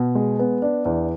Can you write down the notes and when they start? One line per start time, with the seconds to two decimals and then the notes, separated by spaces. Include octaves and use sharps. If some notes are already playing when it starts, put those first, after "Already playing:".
Already playing: B2
0.15 G#3
0.39 B3
0.62 D4
0.85 E2